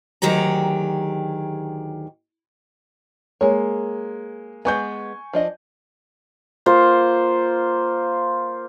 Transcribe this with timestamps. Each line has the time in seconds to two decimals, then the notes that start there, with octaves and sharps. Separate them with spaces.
0.22 D2 D#3 F#3 G4 G#4 A#5
3.41 G#3 A#3 C#5
4.65 G#3 B3 G#5 C#6 G6
5.33 F3 D4 D#5
6.66 A#3 F4 C5